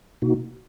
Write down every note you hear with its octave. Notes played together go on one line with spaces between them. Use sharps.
B2 A#3 D#4 F#4